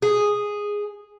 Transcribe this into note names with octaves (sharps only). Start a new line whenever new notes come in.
G#4